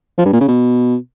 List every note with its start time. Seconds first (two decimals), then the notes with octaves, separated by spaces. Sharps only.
0.18 F3
0.26 G2
0.33 A#2
0.41 C#3
0.48 B2